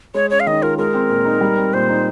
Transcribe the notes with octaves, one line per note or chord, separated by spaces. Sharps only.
G#3 C#5
C#4 C#5
F5
D#3 D#5
F4 A#4
G#3 A#4
C4
A#2
D#4
G3
C4
A#2 C5
D#4